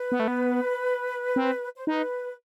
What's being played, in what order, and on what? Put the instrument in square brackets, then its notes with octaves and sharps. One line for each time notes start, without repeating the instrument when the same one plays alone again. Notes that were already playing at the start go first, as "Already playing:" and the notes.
Already playing: [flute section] B4
[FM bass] B3
A3
B3
C4
[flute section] C5
[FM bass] D#4 [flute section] B4